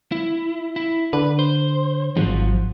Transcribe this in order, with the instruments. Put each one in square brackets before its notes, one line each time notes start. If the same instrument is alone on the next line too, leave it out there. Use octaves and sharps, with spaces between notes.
[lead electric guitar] E4
E4
[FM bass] D3 [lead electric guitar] B4
[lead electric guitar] C5
[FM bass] G#1 [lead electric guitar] F3 F#3